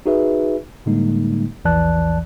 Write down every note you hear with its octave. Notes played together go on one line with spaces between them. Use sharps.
D#4 F#4 G#4 B4 E5
A2 D3 G3 G#3 A#3 D#4
A#1 E2 E3 D5 A5 F#6